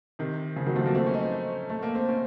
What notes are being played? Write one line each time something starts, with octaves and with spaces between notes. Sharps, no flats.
C3 D#3
C#3 F3
D#3 F#3
F3 A3
F#3 A#3
A3 C4
C#4
C4 D#4
A3
A#3
C4
A#3 C#4